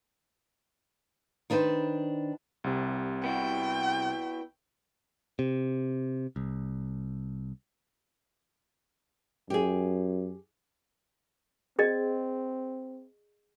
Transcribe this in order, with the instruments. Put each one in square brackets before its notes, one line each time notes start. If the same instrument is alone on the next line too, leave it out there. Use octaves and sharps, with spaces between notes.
[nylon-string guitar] D#3 D4 B4 C5
[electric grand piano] C2 C3
[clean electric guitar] B3 E4 F#4 [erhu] G5
[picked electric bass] C3
C2
[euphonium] F#2 [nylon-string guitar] G4 G#4
[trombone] C4 [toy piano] G#4 D5 D#5